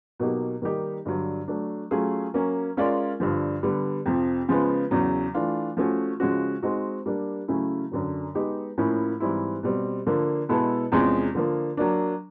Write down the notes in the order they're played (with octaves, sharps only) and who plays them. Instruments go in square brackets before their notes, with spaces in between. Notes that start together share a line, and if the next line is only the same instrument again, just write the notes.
[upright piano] B2 F#3 A#3 D#4 G4
D#3 G3 A#3 D#4 G4
G2 D3 F#3
F#3 A3 D4
F#3 A3 C#4 F4 G#4
F#3 A#3 C#4
G#3 C#4 F4 A#4 D5
G2 D3 F3
D3 G3 B3
F2 C3 F3
C#3 F3 G#3 B3
E2 C#3 F#3
E3 A3 D4 F4
F3 A3 C#4 F#4
C#3 F3 G#3 C#4 F#4
G#3 C4 D#4 F#4
G3 A#3 D4
C#3 F#3 A3 C#4 E4
F#2 D3 F#3
G#3 B3 D#4 G4
A2 F3 A#3 C#4 E4
G#2 E3 G3 C4 E4
B2 G3 C4
D3 F3 A#3
B2 G#3 B3 E4 A4
E2 C3 F3 G#3 C#4
D3 F3 A#3
F#3 A#3 D4